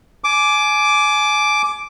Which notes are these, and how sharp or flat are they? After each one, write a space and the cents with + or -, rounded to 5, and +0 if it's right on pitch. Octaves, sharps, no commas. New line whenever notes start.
G#5 +25 D6 +0